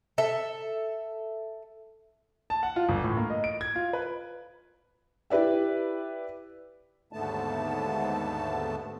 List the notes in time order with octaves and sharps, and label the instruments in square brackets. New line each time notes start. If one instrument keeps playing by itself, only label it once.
[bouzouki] A4 E5
[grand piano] A5
F#5
F4
G1
A2
A#3
D#5
D7
G#6
F4
B4
[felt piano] E4 G4 B4 D5 E5
[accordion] D#2 G#2 D3 A3 B3 A5